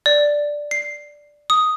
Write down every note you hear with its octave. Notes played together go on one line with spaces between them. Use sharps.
D5
C7
D#6